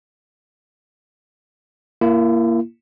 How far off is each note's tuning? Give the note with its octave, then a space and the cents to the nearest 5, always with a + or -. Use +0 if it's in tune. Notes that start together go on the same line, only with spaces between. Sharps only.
A#3 +0 E4 +35